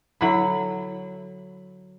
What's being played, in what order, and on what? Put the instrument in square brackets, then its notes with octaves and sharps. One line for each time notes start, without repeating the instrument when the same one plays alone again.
[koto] D3 F#3 [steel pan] E4 B5